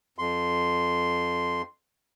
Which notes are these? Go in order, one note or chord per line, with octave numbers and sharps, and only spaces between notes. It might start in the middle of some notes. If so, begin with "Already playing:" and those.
F2 C6